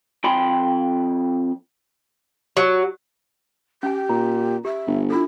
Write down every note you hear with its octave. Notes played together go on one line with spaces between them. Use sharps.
F2 G5 B5 C6
F#3
C#4 G4 G#5
A#2 A#5
G4 E5
G1
D4 E4 F4 A4